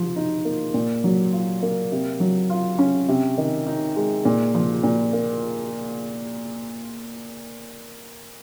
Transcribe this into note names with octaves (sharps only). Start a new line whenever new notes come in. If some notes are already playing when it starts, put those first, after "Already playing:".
Already playing: F3
D#4
A#3
A#2
F#3
F4
A#3
C3
F#3
F4
C#4
C3
D#3
D#4
G#3
A#2
F3
A#2
A#3